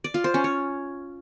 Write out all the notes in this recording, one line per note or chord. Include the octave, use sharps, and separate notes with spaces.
D5
F4
C5
C#4
C#5